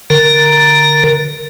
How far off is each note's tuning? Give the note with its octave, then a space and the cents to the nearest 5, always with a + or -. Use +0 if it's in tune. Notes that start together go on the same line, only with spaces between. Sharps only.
D3 +0 A#4 +0 A#5 +0